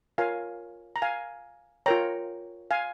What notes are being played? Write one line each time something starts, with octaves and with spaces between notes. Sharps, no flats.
F4 A#4 C#5 F5 G#5
A#5
F5 G#5
F4 A#4 C#5 G5 A#5
F5 G#5